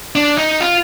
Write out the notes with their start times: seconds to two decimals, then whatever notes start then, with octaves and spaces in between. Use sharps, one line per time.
0.15 D4
0.38 D#4
0.61 F4